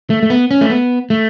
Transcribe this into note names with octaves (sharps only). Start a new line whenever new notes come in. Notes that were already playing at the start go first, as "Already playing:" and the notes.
A3
A3
B3
C#4
A3
B3
A3